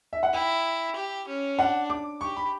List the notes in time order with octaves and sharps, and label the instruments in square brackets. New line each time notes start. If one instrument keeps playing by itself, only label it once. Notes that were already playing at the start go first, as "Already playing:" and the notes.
[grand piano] E5
F#5
[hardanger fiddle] E4 [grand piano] G5
[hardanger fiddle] G4
C#4
[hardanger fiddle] D4 [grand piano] F#5
[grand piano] D6
[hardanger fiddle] G4 [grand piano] C#6
[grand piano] B5